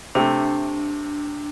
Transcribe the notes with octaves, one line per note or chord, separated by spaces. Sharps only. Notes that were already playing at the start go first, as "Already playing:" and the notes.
C3 A3 D4